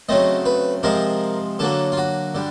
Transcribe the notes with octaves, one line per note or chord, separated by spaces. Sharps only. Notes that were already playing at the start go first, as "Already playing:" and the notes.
C#3 F#3 A3 C4 D#5
B4
C3 F3 G#3 C4 A#4
D3 F#3 A#3 A4
F4
F#4
D3 G3